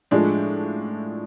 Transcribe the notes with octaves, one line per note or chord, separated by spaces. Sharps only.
A2 F3 G#3 D4